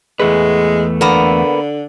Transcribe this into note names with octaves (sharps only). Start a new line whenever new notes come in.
E2 G#3 A3 B4
D3 A#3 B3